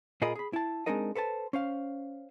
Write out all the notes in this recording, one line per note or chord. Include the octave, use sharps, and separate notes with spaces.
A#2 F4 G#4 A#4 D#5 B5
G#4 B5
E4 A5
G#3 C4 D4 D#4 A#4 D#5
A4 B4 C5 A5
C#4 C5 F5